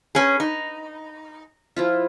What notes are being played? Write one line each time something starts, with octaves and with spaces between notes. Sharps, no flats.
C#4 G#4 B4 B5
D#4
F3 E4 F4